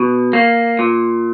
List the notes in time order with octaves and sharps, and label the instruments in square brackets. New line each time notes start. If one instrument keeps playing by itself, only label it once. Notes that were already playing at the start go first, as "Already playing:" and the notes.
Already playing: [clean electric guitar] B2
A#3
A#2